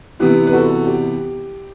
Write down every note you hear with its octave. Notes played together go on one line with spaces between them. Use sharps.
C3 E3 B3 E4 G4 B4
B4
F#4 A4
G4